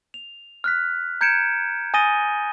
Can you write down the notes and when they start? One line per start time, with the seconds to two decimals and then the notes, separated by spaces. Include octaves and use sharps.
0.14 F7
0.64 F6 F#6 B6
1.21 A#5 G6 G#6 C#7 D7 E7
1.94 G#5 D#6 A6 A#6 D#7 G7